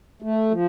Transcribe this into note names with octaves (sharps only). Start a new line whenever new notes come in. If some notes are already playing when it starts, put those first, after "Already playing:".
A3
F3